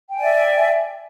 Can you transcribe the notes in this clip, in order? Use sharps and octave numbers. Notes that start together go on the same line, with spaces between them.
D5 E5 G5 G#5